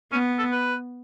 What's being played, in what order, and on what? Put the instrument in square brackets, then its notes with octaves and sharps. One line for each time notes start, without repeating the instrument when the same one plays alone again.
[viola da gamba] B3 [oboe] C#4
[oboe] A4
B4